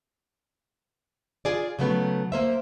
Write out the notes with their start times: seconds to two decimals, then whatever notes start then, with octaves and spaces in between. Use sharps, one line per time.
1.45 F4 G#4 D5
1.79 C#3 F#3 A3 B3
2.32 A#3 C5 E5